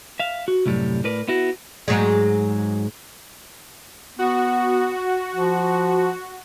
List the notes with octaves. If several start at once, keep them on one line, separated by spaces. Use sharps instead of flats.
E5 F5
F#4
C2 F#2 A2 G3
A2 A#4 B4 D5
B3 E4 F#4
G#2 F#3 G#3
B3 F#4
F3